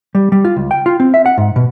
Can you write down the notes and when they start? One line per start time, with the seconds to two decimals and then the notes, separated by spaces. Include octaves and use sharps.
0.15 G3
0.32 G3
0.45 F4
0.56 C#2
0.71 G5
0.86 F4
1.00 C4
1.14 E5
1.26 F#5
1.38 G#2
1.56 B2